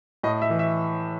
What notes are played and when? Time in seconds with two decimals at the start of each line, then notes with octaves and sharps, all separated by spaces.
0.23 A2 D#5
0.42 E5
0.50 E3
0.59 E5